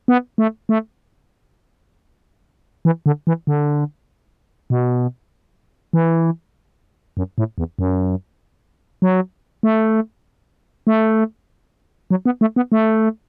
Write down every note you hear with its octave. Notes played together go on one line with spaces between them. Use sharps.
B3
A3
A3
E3
D3
E3
D3
B2
E3
F#2
A2
E2
F#2
F#3
A3
A3
F#3
B3
A3
B3
A3